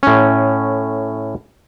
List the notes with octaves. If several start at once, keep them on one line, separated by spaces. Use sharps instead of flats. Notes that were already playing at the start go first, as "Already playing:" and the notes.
A2 C#4